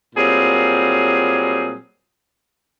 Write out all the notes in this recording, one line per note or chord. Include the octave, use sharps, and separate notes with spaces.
A#2 F#3 G3 C4 G#4